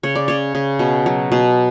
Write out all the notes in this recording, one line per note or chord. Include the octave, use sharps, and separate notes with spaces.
C#3 C#5
D5
C#3 C#5
C#3
B2
F#3
B2